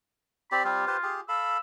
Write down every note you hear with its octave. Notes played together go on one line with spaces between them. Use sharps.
C4 G4 D5 B5
G3 C4 F4 G4
G4 B4 C5
G4 G#4
A4 F5 B5 E6